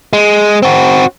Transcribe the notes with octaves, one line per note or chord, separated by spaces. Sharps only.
G#3
C4 F#4